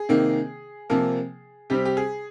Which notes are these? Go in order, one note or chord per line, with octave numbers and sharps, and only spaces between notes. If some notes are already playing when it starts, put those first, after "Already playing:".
Already playing: G#4
C3 D#3 A#3
C3 F3 A#3
C3 G3 C4 G4
G4
G#4